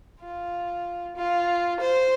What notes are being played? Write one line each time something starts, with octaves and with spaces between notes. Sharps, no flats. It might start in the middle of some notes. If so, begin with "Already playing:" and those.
F4
F4
C5